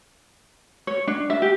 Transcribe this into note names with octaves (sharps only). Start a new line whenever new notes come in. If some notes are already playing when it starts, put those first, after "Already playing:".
C#5
D4
E5
G4